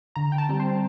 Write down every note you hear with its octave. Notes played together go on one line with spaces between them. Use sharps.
D3 A#5
G5
A5
G3 C4
C5